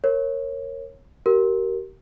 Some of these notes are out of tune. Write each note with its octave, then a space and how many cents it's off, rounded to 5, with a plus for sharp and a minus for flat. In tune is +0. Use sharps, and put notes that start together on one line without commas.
A#4 +0 C#5 -20
G4 -35 A#4 +0